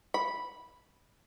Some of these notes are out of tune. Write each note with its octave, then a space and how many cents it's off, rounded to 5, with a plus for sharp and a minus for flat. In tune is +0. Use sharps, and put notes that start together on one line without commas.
B5 -5